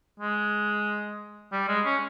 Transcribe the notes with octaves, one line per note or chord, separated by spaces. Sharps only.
G#3
G3
G#3
C#4